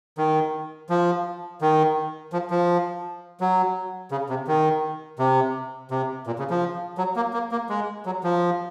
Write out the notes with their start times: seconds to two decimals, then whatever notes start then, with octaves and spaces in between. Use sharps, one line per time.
0.18 D#3
0.90 F3
1.61 D#3
2.33 F3
2.51 F3
3.40 F#3
4.11 C#3
4.29 C3
4.47 D#3
5.19 C3
5.91 C3
6.27 A#2
6.39 C#3
6.50 F3
6.98 F#3
7.16 A#3
7.33 A#3
7.52 A#3
7.69 G#3
8.06 F#3
8.23 F3